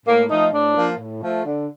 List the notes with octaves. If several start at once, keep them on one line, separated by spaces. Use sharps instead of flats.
A2 A#3
F3 A3 D#4
A2 D4
F3 A#3
A2
F3 A3
D3